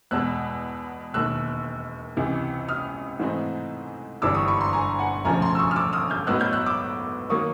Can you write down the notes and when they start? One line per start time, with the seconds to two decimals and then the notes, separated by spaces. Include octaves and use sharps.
0.11 E2 B2 G#3 E6 F#6
1.14 E1 D#2 D#3 E6 F#6
2.17 C#2 C3 E3
2.69 D#6 F6
3.19 G#2 E3 A3 C4 D#4
4.22 G1 G2 E3 G3 D6 E6
4.34 C#6 D#6
4.48 B5 C#6
4.60 A#5 C6
4.73 G#5 A#5
4.99 F#5 G#5
5.24 E1 D2 C#3 F3 A3 G#5 A#5
5.42 A#5 C6
5.55 E6
5.59 C#6 D#6
5.71 F6
5.76 D6 E6
5.93 D#6 F6
6.10 F6 G6
6.27 A2 F#3 B3 D#4 E6 F#6
6.40 F6 G6
6.53 E6 F#6
6.66 D6 E6
7.29 D#3 F#3 A#3 C#6 D#6